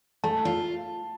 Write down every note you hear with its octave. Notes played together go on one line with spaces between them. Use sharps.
A3 A5
F4